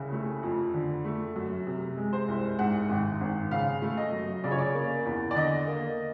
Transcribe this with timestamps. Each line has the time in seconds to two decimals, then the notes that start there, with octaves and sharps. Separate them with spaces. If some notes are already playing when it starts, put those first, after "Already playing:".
Already playing: C2 C#3
0.12 A3
0.43 F2
0.74 D3
1.05 A3
1.36 F#2
1.67 C3
1.97 G#3
2.13 C5
2.28 C2
2.59 G#2 F#5
2.89 G#1
3.21 G#1
3.51 C#3 F5
3.82 A3
3.97 D#5
4.13 F#2
4.44 C#3 D5
4.51 C#5
4.58 D5
4.75 A#3
5.06 E2
5.31 D5
5.36 D3 D#5
5.67 A#3